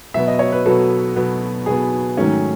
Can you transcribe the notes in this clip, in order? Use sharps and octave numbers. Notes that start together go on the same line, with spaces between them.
B2 F#3 B3 E5
D#5
C#5
B4
B2 F#3 B3 A4
B2 F#3 B3
B2 F#3 B3 G#4
G#2 D#3 F#3 A3 C#4